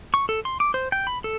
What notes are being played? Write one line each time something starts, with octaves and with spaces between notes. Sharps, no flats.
C#6
A4
C6
D6
C5
G5
B5
A4